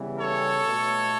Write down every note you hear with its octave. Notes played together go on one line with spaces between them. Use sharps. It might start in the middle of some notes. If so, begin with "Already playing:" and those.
Already playing: C#3 E3 G3 B3
A4 C#5
B2 A3